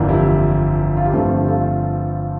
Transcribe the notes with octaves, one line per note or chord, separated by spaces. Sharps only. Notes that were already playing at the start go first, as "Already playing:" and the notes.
Already playing: G1 F2 E3 A#3 D4
E4 G4
F4
G4
G1 G2 F3 A3 C4 F4 A4
G4
F4 A4